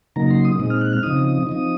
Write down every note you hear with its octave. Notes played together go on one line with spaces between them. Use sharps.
C#3 F#3 A#3 D#4 A#5
C6
D#6
A#2 G#3 C4 D#4 D#6
F6
F#6
F6
C#3 F3 C4 D#4 D#6
F3 C4 D#4